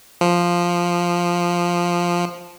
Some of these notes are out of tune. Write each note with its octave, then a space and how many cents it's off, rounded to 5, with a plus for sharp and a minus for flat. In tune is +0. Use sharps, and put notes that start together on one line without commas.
F3 +0